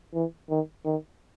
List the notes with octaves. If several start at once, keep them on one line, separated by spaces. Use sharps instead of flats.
E3
D#3
D#3